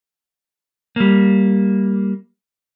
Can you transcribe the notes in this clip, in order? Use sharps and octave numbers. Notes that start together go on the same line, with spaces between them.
G3 A#3